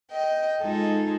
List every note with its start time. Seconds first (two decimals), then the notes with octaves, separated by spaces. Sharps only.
0.12 D#5 G5
0.61 G#3 D#4 F4 G#4 A4